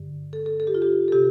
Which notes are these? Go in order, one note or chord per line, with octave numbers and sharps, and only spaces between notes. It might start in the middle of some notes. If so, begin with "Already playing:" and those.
Already playing: G2 D3
A4
A4
A4
G4
F4
G4
A4
C3 G4